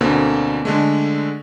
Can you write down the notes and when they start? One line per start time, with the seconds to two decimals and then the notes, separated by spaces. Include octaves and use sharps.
0.01 D2 B2 D3 A#3 C4
0.65 D3 G#3 A3